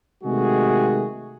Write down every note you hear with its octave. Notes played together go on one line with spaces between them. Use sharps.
C3 D#3 G#3 A3 F#4 G#4